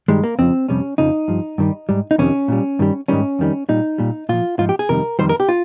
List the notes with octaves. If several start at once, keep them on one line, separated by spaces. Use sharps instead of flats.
G2 D#3 G3 G#3
A#3
F2 C#3 F3 C4
F2 C3 G3 C#4
F2 C#3 F3 D#4
G2 F3
G2 D#3 G3
G#2 G3
D#4
F2 C3 D#3 C#4
A#2 G3
G2 D#3 G3
G#2 D#3 G3 C#4
F2 D#3 G3
A#2 G3 D#4
A#2 G3
A#2 F3 F4
G#2 F3 F4
G4
G#4
F2 C3 D#3 G3 A#4
F2 D#3 G3 C5
A#4
G4
F4